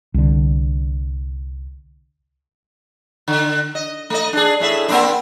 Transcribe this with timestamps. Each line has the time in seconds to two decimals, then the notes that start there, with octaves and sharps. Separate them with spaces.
0.14 C2 D3
3.28 D3
3.75 D#5
4.10 A3 D#5
4.33 D4 G#4
4.60 A2 G#4 E5
4.88 A#3 C4 D4